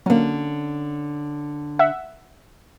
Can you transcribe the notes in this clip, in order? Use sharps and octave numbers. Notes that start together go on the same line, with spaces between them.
D3 F#3 A#3 C#4
E5 F#5